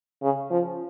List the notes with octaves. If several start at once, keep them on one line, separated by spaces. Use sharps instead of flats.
C#3
F3